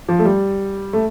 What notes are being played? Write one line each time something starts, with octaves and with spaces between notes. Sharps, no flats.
F3
A3
G3
A3